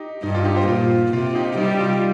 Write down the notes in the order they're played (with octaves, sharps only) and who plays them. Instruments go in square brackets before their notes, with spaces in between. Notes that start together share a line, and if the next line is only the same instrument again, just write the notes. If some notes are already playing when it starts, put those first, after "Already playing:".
Already playing: [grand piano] D#4 G4
[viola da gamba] G2 [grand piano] D#4
[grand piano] F4
D#4 G4
G4 C5
[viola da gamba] A#2 [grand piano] F4
[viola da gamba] C3 [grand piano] F4
[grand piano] D#4 G4
[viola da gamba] G3 [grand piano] D#4 G4
[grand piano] F4